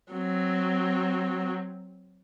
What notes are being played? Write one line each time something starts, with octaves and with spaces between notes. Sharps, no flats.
F#3 C4